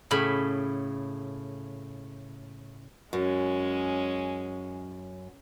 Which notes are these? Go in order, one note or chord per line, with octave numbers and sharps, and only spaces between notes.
A2 C#3 B5
F#2 G#3 C#4